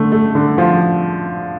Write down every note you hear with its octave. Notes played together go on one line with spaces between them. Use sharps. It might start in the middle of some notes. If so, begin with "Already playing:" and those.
Already playing: D3 A3
A3
D3
F3